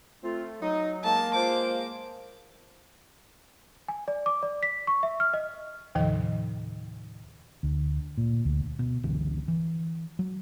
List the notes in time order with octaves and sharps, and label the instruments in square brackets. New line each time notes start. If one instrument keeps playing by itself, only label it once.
[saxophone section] A3 [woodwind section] C4 F4
[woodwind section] F#3 [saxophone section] D#4
[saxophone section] G#3 A#3 [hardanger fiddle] A5
[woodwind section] F4 C5 [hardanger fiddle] D6
[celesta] G#5
D5
D6
D5
B6
C#6
E5
F6
D#5
[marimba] D#2 A2 C3 D#3 F3 D#5
[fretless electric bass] D2
A#2
D2
[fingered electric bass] B2
G1 C#2 D3 E3
E3
F#3